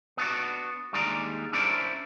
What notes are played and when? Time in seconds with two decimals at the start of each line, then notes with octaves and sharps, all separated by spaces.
0.17 B3 D4 F#4
0.93 D#2 G3 G#3 D4 D5 A#5
1.53 C#4 D4 E4 A#4 C5 D5